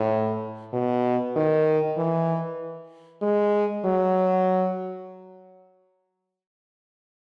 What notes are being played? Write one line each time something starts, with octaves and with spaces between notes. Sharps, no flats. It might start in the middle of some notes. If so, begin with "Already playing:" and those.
Already playing: A2
B2
D#3
E3
G#3
F#3